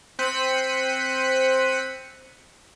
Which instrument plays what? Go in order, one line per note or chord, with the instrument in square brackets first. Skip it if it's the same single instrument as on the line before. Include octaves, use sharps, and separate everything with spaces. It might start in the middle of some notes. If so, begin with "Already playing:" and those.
[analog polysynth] C4 C5 F#6 B6 C#7 D#7